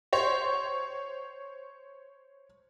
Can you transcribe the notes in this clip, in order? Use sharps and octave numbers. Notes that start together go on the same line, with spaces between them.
C5 C#5